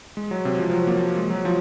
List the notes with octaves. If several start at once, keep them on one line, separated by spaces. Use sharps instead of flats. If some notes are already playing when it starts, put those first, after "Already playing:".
G#3
F#3
C3
F3
F3
F#3
A#3
G#3
F#3
F3